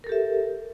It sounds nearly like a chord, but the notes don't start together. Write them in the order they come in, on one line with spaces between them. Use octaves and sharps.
A#4 A4 G4 E5